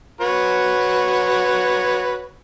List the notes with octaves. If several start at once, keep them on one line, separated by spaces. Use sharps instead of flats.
F#4 B4 C#5